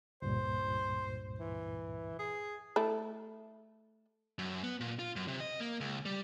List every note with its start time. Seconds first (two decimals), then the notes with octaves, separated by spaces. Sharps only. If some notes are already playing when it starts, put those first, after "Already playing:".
0.22 C#2 G2 A#2 C5
1.39 E3
2.19 G#4
2.76 A3 E4
4.39 F#2
4.63 B3
4.80 A#2
4.99 F4
5.16 F#2
5.28 C3
5.40 D#5
5.60 A#3
5.80 C#2
6.05 G3